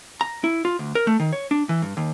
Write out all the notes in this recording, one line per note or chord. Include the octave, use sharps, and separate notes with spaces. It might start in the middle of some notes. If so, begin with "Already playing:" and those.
A#5
E4
F4
D2
A#4
A3
D#3
C#5
D4
E3
G2
D#2